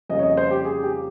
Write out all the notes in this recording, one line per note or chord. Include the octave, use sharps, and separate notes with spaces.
F2 C#3 G3 A#3 D#5
C#5
D#5
C5
G4
G#4
G4